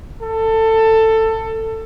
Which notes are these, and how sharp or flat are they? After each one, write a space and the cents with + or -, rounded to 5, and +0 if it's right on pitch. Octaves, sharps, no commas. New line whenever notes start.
A4 +20